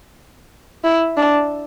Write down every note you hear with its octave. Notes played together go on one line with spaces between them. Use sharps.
E4
D4